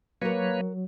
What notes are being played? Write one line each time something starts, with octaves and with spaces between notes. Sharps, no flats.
F#3 A#3 F#4 A#4 B4 C#5